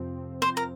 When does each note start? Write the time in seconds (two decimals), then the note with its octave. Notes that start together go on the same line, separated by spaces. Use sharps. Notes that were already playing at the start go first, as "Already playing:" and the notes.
Already playing: F2 C3 F3 C4
0.42 C5
0.57 A#4